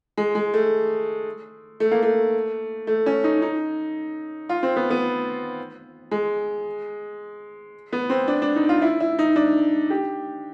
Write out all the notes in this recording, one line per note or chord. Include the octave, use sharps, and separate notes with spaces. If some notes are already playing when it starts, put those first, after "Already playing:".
G#3
G#3
A3
A3
A#3
A3
A3
C#4
D#4
D#4
F4
C4
B3
B3
G#3
B3
C4
D4
D4
D#4
F4
E4
E4
D#4
D4
G4